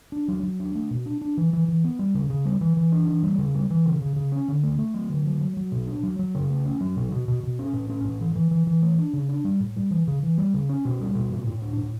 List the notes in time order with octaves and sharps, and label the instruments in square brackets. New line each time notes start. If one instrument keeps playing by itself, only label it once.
[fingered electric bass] D4
F#3
F#3
D4
A3
B2
D4
D4
E3
E3
E3
B3
G3
C#3
C#3
G3
E3
E3
D4
E3
G3
C#3
G3
E3
C#3
C#3
C#3
C#4
D3
A3
A3
F#3
D3
F#3
F#3
F#3
B2
D4
F#3
F#3
C#3
A3
C#4
F#3
B2
B2
B2
B2
C#4
A2
C#4
A2
E3
E3
E3
E3
A3
D4
C#3
D4
G3
A2
G3
E3
C#3
E3
G3
C#3
C#4
B2
G3
B2
A2
A2
D4
A2